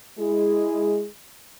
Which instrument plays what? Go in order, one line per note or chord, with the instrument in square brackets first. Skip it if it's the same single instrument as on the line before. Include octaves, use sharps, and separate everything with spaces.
[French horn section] G#3 E4 G#4